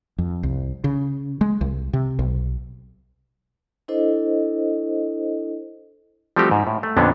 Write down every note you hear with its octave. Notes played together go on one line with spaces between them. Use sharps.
F2
C2
C#3
G#3
C2
C3
B1
D4 E4 A4 C5 D#5
F3 G3 A3 C4 F#4 G4
G#2
A2
A3
F2 A#2 D3 B3 C#4 D4